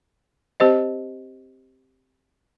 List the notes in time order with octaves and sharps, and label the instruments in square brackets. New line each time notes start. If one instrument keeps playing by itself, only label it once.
[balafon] C4 G4 C5 D#5